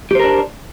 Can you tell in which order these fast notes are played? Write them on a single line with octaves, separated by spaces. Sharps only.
G4 C5 A#4 D4